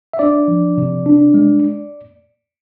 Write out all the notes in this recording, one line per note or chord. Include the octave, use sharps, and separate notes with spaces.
E5
D4 D5
F3
C3
D4
G#3